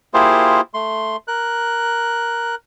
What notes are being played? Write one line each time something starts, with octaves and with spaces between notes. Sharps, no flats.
A#3 E4 F4 G4 G#4 C5
A3 C6
A#4 F#6